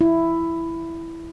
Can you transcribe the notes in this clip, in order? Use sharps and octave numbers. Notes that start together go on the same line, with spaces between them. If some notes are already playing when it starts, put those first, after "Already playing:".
E4